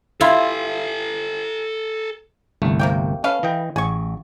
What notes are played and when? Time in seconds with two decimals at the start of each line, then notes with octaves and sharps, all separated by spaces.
0.21 E4 F4 A4 G#5
2.62 G1 C2 A3
2.79 C3 A#3 G5
3.24 C#4 A4 B4 F5
3.43 E3 D#5 G5
3.76 A1 G#4 C#6